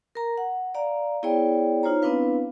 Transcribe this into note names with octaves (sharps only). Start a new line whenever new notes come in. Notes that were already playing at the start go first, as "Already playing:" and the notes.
A#4 A#5
F#5
D5 F5 A#5
B3 E4 G#4 C#5 D5 G5
D#4 F4 C5 C#5 A#5
B3 C4 D4 E4 B4 F5